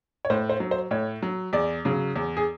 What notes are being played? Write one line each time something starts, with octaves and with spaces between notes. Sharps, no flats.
C#5
A2 C5
C5
F#3
C5
A2 C#5
F#3
E2 D5
C#3 F#3
E2
G#4